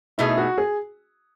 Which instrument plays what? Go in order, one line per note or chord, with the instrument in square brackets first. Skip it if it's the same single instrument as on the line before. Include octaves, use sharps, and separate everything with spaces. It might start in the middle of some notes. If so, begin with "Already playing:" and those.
[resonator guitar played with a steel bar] B2 A3 D#4 G#4 [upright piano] E4
[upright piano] F#4
G#4